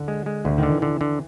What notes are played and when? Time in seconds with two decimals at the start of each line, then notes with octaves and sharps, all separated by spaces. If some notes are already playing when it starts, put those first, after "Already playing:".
Already playing: D3
0.08 G#3
0.26 G#3
0.45 D2 D3
0.58 D#3
0.63 D3
0.70 E3
0.82 D3 E3
1.01 D3